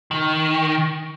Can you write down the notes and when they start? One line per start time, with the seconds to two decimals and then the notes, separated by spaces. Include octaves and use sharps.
0.11 D#3